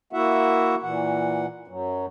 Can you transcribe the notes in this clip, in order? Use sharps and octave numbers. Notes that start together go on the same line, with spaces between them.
A#3 E4 F#4 E5 F#5
A#2 E3 F#5
F#2 F#3